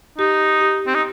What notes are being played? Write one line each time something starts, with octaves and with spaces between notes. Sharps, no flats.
D#4 G4
G4
C4
D#4